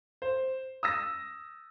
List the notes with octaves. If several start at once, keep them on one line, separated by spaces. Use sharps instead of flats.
C5
D#6 E6 A#6